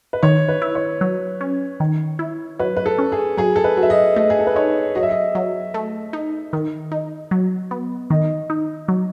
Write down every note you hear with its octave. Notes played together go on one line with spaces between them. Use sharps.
B4
D#3 C#5
B4
E4
C#5
F#3
C#4
D#3
E4
F#3 B4
B4
A4
C#4
G#4
F#3 G#4
A4
B4
F#3
E5
D#5
A3 D#5
G#4
A4
B4
D#4 C#5
F#3 D#5
E5
D#5
F#3
A3
D#4
D#3
D#4
F#3
B3
D#3 D#5
D#4
F#3